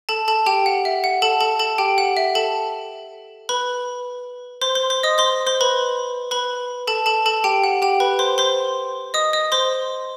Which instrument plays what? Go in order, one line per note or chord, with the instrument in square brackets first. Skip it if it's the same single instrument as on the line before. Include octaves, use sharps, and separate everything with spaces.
[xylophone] A4 A5
A4 A5
G4 G5
F#5
E5
F#5
A4 A5
A4 A5
A4 A5
G4 G5
F#5
E5
A4 A5
B4 B5
C5 C6
C5 C6
C5 C6
D#5 D#6
C5 C6
C5 C6
B4 B5
B4 B5
A4 A5
A4 A5
A4 A5
G4 G5
F#5
G4 G5
B4 B5
C5 C6
C5 C6
D#5 D#6
D#5 D#6
C5 C6